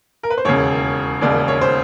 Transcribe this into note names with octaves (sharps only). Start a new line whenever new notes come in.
A#4
B4
C5
E1 D#2 C#3 C#5
E1 D#2 C#3 D5
C#5
C5